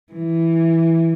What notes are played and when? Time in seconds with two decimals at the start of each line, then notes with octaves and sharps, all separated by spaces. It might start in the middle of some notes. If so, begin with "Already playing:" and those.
0.13 E3